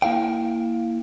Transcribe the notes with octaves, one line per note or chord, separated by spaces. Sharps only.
A#3 E4 F5 G5